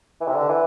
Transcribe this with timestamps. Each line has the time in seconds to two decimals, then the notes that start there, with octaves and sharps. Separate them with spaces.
0.21 E3
0.28 C3
0.35 D3
0.49 E3